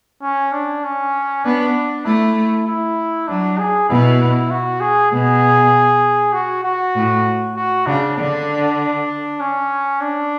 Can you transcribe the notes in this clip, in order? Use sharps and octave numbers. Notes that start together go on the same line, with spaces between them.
C#4
D4
C#4
B3 D4
A3 E4
E4
F#3 D4
G#4
B2 E4
F#4
G#4
B2 G#4
F#4
F#4
A2
F#4
C#3 D4
D3 D4
C#4
D4